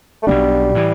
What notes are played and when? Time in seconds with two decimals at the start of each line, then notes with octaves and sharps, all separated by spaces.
0.23 A3
0.27 B1 B2 G3 B3 D4
0.75 A2 E3